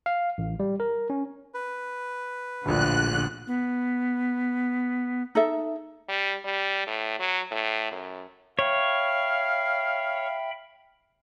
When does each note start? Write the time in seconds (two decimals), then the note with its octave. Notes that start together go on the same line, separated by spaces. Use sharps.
0.06 F5
0.38 A1
0.60 G3
0.80 A#4
1.10 C#4
1.54 B4
2.66 D1 A#1 A#2 D3 F#6
3.47 B3
5.35 D#4 A4 E5
6.09 G3
6.45 G3
6.87 A2
7.20 F#3
7.51 A2
7.92 F#2
8.59 C#5 E5 F5 G5 B5